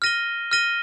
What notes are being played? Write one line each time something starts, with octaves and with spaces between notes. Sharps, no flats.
F6 A#6 D#7 G7
F6 A#6 D#7 G7